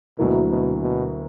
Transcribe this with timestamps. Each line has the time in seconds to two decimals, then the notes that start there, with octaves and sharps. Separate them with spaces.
0.18 D2 B2 D3 F#3 A#3 E4
0.50 B2
0.82 B2